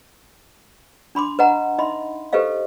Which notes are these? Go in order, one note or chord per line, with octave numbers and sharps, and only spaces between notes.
D4 B5 C6 D6
B4 D#5 F#5 A#5
D#4 D#5 E5 B5 C6
G4 A4 B4 C5 D#5 F5